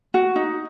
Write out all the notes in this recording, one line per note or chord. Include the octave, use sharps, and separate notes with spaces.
F#4
D#4